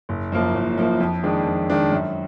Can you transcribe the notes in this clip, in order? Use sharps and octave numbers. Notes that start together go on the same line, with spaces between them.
F#1
F#2 F3 A#3
F#1
F#2 F3 A#3
F2
D#3 G#3 D4
F2
D#3 G#3 D4
F#2